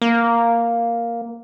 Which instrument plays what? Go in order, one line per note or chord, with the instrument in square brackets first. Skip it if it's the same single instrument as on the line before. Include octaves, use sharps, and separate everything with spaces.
[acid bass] A#3